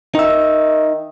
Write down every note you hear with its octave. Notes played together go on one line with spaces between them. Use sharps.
D#3 D#4 E5